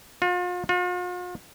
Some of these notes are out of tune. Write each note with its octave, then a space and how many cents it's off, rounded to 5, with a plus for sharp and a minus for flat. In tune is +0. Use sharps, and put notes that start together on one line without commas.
F4 +40
F4 +45